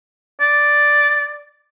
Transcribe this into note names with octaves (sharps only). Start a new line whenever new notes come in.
D5